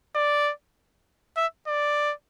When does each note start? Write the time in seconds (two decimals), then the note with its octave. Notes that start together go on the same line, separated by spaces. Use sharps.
0.16 D5
1.37 E5
1.67 D5